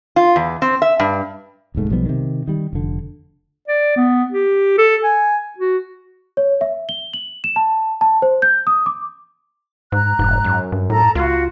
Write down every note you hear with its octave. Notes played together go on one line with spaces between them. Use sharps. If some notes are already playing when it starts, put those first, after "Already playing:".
F4
E2
C4
E5
G2
D1 C2 G#2 A3
B1 F3 G3 B3
C3 D#3
D#3 G3
F1 D3
D5
B3
G4
A4
G#5
F#4
C#5
E5
G7
F#7
E7
A5
A5
C5
G6
D#6
D6
G#2 A#5 F#6
F1 G#2
F#2
G2
A2 A4 A#5
C#2 F4 F#4 F5